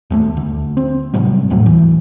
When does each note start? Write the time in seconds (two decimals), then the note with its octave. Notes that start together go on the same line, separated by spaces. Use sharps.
0.10 D#2 G#3 A3
0.37 D2
0.77 C4
1.14 G#2 C3 F#3 G3
1.50 D#2 A2 F#3 A3
1.66 E3